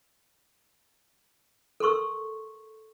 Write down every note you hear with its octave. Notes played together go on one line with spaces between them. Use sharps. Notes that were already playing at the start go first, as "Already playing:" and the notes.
A4 A#4 C6 C#6 E6